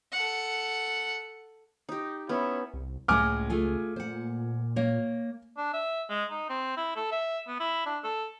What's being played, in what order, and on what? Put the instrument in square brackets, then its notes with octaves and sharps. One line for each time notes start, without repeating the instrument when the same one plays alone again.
[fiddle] A4 F#5
[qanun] D#4 G4
[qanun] B3 [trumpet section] C#4 E4
[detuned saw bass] C2
[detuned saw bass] C#2 [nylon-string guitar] A2 G#3 A#3 [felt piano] G#5 D6 F6
[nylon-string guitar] A3 F4 G#4
[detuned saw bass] A#2 [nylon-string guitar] C5 F#5
[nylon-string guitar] A#3 C#5
[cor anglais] D4
E5
G#3
D#4
C4
E4
A4
E5
B3
E4
D4
A4